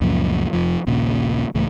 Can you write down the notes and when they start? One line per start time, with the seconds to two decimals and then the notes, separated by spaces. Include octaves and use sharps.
0.01 C#2 F#2 A#2 F3
0.53 F1 F2 F3
0.86 A#1 D#2 A#2 C#3
1.55 C#2 A2 E3